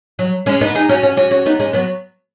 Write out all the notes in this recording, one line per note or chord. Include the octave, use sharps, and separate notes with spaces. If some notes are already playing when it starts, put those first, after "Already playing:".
F#3
G#3 C#4
B3 D#4
D#4 G#4
C#4 F#4
C#4 F#4
C#4 F#4
C#4 F#4
B3 D#4
G#3 C#4
F#3 B3